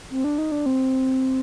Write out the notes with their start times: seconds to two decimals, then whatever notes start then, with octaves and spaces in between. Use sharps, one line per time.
0.10 C4
0.24 D4
0.38 D#4
0.52 D4
0.66 C4